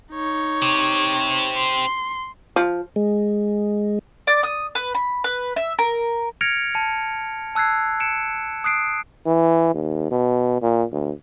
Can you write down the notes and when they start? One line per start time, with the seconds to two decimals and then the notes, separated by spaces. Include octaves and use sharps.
0.12 D#4 C#5
0.62 C4 G4
1.56 C6
2.56 F3
2.96 G#3
4.27 D5
4.43 D#6
4.75 B4
4.95 B5
5.24 B4
5.56 E5
5.79 A#4
6.41 F6 G#6 A#6 C#7 D7 F7
6.74 A5 C#7
7.55 A5 E6 F#6 G#6 C7
8.00 C#7 D7 E7
8.64 D#6 F#6 C7 D7
9.26 E3
9.75 D#2
10.11 B2
10.62 A#2
10.92 D2